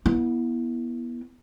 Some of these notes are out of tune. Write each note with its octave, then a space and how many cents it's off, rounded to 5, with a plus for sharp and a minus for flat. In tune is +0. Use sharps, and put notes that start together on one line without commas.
B3 -25 E4 +0